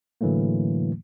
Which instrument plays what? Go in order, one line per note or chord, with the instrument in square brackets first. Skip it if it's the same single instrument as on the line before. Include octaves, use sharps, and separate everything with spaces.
[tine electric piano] A2 D3 E3 F#3 A3 A#3